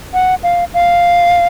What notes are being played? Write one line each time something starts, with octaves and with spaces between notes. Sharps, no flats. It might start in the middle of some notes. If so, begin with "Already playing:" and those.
F#5
F5
F5